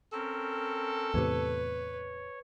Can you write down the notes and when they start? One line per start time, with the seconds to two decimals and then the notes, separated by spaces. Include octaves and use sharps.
0.13 C4 C#4 A4 A#4
1.14 E2 A2 C3 B4 C#5